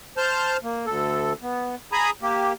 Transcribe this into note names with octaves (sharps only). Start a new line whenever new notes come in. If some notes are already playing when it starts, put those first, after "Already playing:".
C5 A5 F6 G6
A#3
D2 A4
B3
G#4 G#5 A#5 B5 D#6
A#3 G4